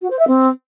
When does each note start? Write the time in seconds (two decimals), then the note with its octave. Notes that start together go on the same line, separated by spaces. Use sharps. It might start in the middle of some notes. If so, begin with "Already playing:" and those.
0.02 F#4
0.10 C5
0.19 E5
0.27 C4